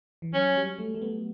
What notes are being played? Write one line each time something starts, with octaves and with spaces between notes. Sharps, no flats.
E3
F#3 C#4
G3
A3
A3
B3